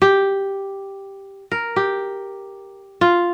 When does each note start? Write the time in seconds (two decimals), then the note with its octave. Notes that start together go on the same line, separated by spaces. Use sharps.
0.02 G4
1.52 A#4
1.76 G4
3.01 F4